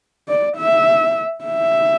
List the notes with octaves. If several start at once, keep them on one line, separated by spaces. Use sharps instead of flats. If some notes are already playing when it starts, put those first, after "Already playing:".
D5
E5
E5